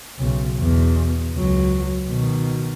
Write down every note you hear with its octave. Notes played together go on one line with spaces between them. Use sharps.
B1 C#3
E2 B2
C#2 F#3
B2 D#3